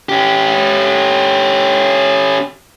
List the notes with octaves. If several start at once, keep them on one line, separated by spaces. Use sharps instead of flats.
C#4 G4